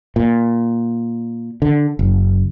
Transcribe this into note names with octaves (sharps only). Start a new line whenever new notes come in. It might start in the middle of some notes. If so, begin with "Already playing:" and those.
A#2
D3
F#1